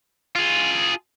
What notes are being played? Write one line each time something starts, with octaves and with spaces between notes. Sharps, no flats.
F4 G#4